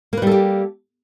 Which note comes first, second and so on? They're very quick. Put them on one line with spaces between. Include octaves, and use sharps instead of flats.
A#3 B4 G3 A4 G4